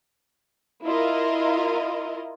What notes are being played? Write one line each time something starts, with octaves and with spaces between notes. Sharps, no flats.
E4 F4 A#4 D#5